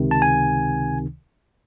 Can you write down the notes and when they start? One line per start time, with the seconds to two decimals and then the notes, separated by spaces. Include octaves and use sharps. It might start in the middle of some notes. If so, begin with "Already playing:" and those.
Already playing: C#2 C3 D#3
0.11 A5
0.22 G#5